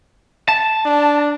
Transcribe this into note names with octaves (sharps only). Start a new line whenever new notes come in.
A5
D4